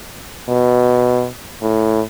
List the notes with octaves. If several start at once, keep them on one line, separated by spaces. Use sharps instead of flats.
B2
A2